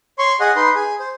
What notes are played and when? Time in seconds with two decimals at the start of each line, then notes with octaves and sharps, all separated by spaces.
0.19 C#5 C6 C#6
0.40 G#4 D#5 F#5
0.56 D#4 B4 C6
0.75 G#4
1.00 C5